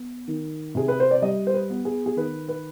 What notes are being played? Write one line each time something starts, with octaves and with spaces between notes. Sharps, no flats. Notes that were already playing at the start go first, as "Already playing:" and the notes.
Already playing: B3
D#3
C3 G#4
B4
C5
D5
G3 D#5
C5
B4
B3
G#4
G#4
D#3 B4
B4